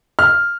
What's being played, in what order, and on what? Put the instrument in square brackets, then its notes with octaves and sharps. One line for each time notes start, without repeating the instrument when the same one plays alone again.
[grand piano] F6